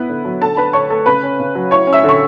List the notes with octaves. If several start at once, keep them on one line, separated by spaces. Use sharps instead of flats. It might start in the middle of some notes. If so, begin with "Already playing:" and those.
Already playing: B3 E4 B4
D3
F#3
D3 A4 A5
D4 B4 B5
D3 C#5 C#6
A3 A4 A5
C#3 B4 B5
C#4
C#3
F#3
E4 C#5 C#6
C#4
E5 E6
D3 C#6